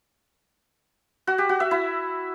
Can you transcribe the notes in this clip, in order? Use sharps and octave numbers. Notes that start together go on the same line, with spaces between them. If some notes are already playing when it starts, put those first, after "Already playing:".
F#4
G4
F#4
E5
E4